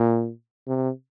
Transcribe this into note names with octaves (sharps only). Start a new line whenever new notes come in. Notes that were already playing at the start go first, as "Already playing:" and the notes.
Already playing: A#2
C3